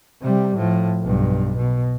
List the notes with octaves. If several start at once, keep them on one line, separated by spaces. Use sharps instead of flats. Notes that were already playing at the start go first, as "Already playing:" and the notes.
C3 G3
A2 F3
B1 G2
B2